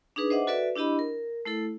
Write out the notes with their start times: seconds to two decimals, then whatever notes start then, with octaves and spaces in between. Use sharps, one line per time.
0.16 D4 D#4 G#4 B4
0.30 C5 D#5 E5 F#5 D6
0.47 F#4 A4 B4 D5 E5
0.75 D4 E4 G4 D#5 B5
0.99 A#4
1.45 A3 E4 A4